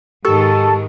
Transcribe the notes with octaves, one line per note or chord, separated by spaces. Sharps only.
G#2 D#3 G#3 G4 A4 C#6